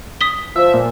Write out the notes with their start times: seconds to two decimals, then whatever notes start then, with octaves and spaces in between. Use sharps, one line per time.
0.21 D#6 B6 G7
0.56 F3 E5
0.74 A#2